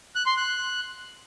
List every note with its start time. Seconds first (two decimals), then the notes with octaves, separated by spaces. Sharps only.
0.16 F#6
0.26 C6
0.37 F#6